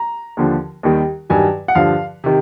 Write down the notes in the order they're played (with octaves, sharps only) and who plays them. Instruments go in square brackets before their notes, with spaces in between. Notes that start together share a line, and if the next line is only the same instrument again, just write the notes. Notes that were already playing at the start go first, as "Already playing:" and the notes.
Already playing: [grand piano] A#5
D#2 D3 F3
D#2 D#3 G3
G2 D#3 F#3 G#5
F#5
G2 D3 F3 F5
C3 D#3